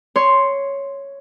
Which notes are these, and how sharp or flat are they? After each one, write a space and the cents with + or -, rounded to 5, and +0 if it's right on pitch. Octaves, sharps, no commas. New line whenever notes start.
C#5 +0 C6 +0